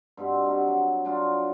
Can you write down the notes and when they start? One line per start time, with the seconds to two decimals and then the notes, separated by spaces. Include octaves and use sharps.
0.17 G2 B2 C4 G4
0.46 C3 F#4
0.68 F#3
1.05 F#3 D4 F4 F#4